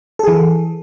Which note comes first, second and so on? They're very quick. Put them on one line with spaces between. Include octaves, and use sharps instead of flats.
A4 G#4 E3